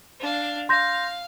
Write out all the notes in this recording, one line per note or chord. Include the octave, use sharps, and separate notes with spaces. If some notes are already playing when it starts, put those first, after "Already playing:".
D4 F5
F5 C6 G6 A#6